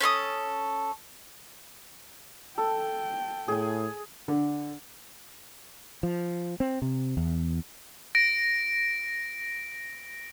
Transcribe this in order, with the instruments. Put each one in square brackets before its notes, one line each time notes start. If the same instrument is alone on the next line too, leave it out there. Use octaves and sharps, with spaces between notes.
[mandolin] C#4 A4 C6 D#6
[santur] A4 [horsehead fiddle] G5
[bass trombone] A2 [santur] G#4 G#5
[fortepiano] D3
[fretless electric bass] F3
C4
C3
E2
[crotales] A#6 D7